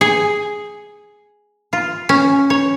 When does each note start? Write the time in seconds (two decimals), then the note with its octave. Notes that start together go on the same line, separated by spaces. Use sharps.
0.01 G#4
1.73 F4
2.09 C#4
2.50 C#5